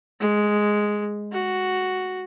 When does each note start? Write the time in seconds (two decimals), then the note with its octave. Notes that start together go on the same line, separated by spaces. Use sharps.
0.20 G#3
1.32 F#4